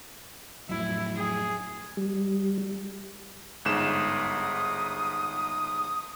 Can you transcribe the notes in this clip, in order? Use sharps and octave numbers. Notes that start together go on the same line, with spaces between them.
F2 A2 F#3 E4
G#4
G3
G1 G#2 D#6 E7